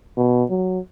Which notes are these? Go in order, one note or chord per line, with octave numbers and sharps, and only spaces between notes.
B2
F#3